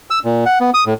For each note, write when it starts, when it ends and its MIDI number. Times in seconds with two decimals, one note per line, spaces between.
0.10 0.19 88
0.25 0.44 46
0.46 0.59 78
0.60 0.70 59
0.74 0.84 87
0.86 0.94 45